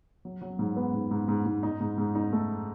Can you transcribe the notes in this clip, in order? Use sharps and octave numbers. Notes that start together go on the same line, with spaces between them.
F#3
F#3
G#2
B3
G#2
G#2
G#2
G#2
D#4
G#2
G#2
D#4
A3